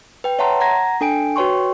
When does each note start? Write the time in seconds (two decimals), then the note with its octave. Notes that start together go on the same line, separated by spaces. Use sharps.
0.24 B4 G5
0.39 C#5 E5 F#5 A5 A#5 C6
0.61 F#5 A#5 G#6 A#6
1.01 D4 A4 G5 G#5 D7
1.36 F#4 B4 C#5 G5 C6 C#6